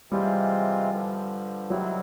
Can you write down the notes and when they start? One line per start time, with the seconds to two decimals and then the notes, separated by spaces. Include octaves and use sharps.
0.10 C3 E3 G3 G#3 C4 F4
0.91 G2 D3 F3
1.69 C3 D#3 F#3 G3 C4 E4